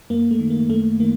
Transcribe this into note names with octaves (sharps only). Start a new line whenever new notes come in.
F#2 A#3
A3
D#3
A#3
F#2 A3
D#3 A#3